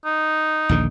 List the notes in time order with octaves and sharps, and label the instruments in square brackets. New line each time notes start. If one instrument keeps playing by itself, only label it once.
[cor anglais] D#4
[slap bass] A#1 D#2 D3